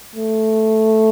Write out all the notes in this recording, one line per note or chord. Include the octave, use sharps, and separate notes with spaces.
A3